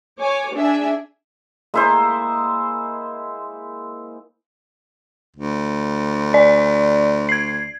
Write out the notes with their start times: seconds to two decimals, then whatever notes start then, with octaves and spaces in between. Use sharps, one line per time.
0.20 C#5 G#5 D6
0.55 D4 G#4 E5 G#5
1.74 G#3 A#3 E4 C5
5.36 D2
6.34 D5
7.29 G#6 C7